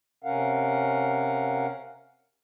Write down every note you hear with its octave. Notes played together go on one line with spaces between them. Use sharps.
C3 C#4 A#4 F5 F#5